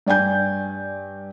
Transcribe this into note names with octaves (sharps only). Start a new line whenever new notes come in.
G2 D5 G5 G#5 G6